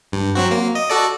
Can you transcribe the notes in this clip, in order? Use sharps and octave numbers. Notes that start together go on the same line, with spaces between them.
G2
F#3 C4 F#4
A#3
D#5
F#4 A4 D5